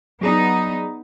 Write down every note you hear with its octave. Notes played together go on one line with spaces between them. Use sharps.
F#3 B3 D#4 G#4 D5